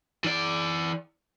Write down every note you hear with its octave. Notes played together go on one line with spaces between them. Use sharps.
E3 D5